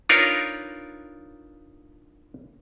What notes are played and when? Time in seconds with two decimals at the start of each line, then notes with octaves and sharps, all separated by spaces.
0.09 D4 D#4 F4 A#4 B4 C#5